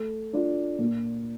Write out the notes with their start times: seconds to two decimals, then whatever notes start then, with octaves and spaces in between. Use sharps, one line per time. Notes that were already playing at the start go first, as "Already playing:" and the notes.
Already playing: A3
0.33 D4 F4
0.79 A#2